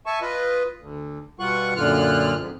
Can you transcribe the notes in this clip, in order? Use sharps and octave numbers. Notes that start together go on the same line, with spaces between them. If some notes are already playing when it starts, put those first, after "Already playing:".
E5 G#5 A5 C#6
F4 B4 D#5
D2
B2 G3 F4 F#5 C#6 F#6
F#2 A#2 D3 F4 F6 F#6
F2 G#2